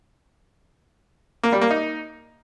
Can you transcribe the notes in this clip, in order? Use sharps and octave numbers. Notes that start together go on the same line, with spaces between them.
A#3
G3
A#3
D#4